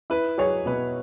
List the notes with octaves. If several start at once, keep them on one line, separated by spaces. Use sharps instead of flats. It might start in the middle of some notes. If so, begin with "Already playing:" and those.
E4 B4
F#3 G#4 C#5
B2 B4